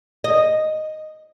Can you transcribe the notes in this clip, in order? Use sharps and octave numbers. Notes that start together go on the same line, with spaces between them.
D#5